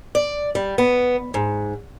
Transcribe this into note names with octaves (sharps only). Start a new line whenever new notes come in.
D5
G3
B3
G#2